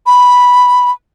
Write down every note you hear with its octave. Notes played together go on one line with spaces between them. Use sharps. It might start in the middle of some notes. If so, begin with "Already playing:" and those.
B5